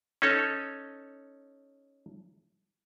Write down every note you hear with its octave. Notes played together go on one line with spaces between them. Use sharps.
C#4 D#4 A4 C#5